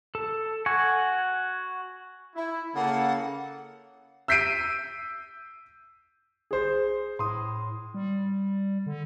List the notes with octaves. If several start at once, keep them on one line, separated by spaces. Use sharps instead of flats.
A4
F#4 G#5 C#6
E4
C#3 A#3 A4 F#5
E6 G6 B6 C7 D7 D#7
G#4 C5
A2 C6 D#6
G3
D3